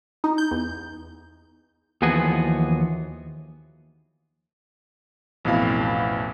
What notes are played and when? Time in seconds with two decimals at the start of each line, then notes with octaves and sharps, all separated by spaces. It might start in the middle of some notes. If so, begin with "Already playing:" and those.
0.24 D#4
0.38 G6
0.51 E2
2.02 D#2 E3 F3 B3 F#4 G#4
5.45 A1 F2 B2 E4 F5 B5